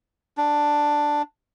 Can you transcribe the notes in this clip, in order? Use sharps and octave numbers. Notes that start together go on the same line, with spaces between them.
D4